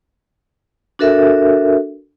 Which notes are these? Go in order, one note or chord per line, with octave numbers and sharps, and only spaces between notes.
D4 F#4 A4 A#4 E5